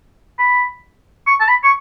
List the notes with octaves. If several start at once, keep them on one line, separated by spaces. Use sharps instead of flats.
B5
C#6
A5
B5
C#6